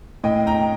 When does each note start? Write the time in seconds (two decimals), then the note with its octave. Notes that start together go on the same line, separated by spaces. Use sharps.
0.24 A2 D#5 G5
0.47 G5 A#5